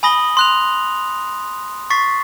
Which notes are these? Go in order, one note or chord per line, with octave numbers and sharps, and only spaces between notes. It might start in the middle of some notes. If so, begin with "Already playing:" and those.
G#5 B5 D#6 A#6 F#7 G7
C6 F#6 F7
C#6 A6 B6 C7